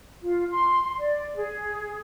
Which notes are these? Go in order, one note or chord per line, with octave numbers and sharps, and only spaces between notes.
F4
C6
D5
G#4